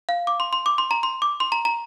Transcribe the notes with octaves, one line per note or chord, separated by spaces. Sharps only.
F5
D6
C6
C6
D6
C6
A#5
C6
D6
C6
A#5
A#5